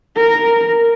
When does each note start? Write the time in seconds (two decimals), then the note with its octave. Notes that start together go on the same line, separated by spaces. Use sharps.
0.16 A#4